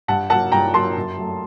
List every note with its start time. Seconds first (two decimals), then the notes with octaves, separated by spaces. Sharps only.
0.08 G2 F#5 A5
0.30 F#3 A#3 F#5 A5
0.52 G2 G5 A#5
0.74 F#3 A#3 A5 C6
0.96 F#2
1.18 F#3 A3